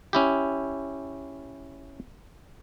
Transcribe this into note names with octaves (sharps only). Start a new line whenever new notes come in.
C#4 E4 G4